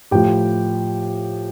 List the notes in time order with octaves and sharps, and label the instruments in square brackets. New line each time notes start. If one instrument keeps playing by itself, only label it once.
[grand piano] A2 F3 G4 G5